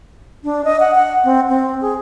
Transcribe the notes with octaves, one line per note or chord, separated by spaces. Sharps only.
D4
D#5
F#5
F#5
C4
C4
G#4